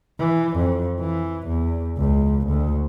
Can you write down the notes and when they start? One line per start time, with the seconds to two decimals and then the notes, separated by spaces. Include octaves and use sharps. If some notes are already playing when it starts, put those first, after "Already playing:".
0.20 E3
0.57 F2
1.00 E3
1.48 E2
1.98 C#2
2.48 D2